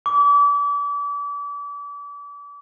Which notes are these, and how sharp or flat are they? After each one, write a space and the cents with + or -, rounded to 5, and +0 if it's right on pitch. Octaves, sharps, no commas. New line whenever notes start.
D6 -35